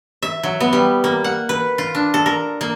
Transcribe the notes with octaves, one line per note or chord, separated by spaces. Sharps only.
E5
F#3
B3
G3
A#3
F#5
B4
F4
D4
A4
A#4
A#3